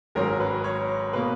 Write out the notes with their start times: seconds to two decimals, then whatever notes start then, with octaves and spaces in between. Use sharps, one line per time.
0.15 G#1 G#2 F#3 C#4 A#4
0.40 B4
0.64 C#5
1.13 B2 A#3 B4